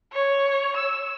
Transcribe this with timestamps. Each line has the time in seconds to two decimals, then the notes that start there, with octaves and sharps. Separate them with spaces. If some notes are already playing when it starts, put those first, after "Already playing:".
0.12 C#5
0.76 E6